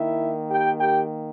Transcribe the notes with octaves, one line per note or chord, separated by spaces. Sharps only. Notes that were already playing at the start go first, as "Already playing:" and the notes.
Already playing: D#3 A#3 E4 E5
G4 G5
G4 G5